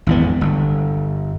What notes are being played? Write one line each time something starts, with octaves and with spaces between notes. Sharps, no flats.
G#1 E2 B3
G1